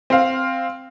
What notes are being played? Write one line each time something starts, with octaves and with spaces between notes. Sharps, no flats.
C4 F5